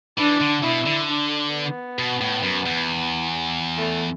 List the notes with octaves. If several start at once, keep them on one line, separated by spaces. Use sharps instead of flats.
E3 D4
D3
B2 E4
D3
D4
B3
B2
A2
F#2
E2
A3